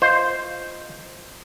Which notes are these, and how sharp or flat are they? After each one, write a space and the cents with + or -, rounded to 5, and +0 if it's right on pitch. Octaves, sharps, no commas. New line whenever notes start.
F4 +0 C5 +0 D#5 +0